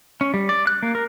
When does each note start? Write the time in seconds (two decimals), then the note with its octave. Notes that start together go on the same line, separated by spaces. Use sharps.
0.21 C#4
0.34 G3
0.49 D5
0.67 F#6
0.83 A#3
0.95 A#4